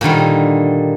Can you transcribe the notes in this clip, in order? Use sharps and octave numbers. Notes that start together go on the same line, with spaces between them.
A#2 D3 D#3 G3